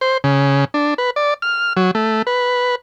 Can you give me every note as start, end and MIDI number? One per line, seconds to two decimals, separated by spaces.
0.01 0.18 72
0.24 0.65 49
0.74 0.94 62
0.98 1.10 71
1.16 1.34 74
1.42 1.73 89
1.76 1.91 54
1.95 2.22 57
2.27 2.75 71